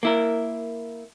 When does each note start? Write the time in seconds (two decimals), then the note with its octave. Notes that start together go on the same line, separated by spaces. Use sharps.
0.03 A#3 E4 A#4